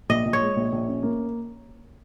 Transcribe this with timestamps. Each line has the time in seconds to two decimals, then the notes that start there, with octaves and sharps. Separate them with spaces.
0.09 A#1 D#5
0.25 A#1
0.33 C#5
0.41 G#3
0.56 A#1
0.72 A#1
0.88 C#4
1.03 A#3